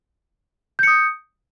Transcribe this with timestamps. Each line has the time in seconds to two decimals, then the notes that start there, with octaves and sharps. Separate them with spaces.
0.79 G6
0.83 C#7
0.87 D#6